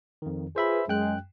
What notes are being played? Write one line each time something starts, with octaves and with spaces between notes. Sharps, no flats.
F2 D#3
F4 G#4 B4 C5 E5 B5
F#2 G#3 G5 F#6